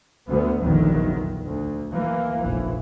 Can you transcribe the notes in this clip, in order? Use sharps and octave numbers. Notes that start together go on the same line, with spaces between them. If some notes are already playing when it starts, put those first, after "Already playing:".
D2 B3
F1 A#1 E2 D3 D#3 F#3
D2
E3 A#3
F1 A#1 E3